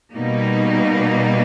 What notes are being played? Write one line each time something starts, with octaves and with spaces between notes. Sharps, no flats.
B2 G3 A#3 D#4